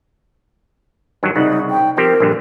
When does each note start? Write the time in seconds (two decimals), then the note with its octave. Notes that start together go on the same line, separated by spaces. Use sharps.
1.23 G2 D#3 F#3
1.36 C2 C#3 D#4 F#5
1.70 G5
1.97 F3 C4 G4 A#4
2.20 A#1 G2 D3